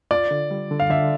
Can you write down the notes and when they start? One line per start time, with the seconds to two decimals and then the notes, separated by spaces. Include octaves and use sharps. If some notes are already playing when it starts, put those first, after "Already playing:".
0.11 F4 D5
0.31 D3
0.51 G3
0.71 D3
0.80 F5
0.90 D3 E5